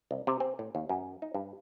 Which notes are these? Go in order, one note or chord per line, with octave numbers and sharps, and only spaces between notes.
C2
C3
C4
A2
D#2
F#2
D#4
G2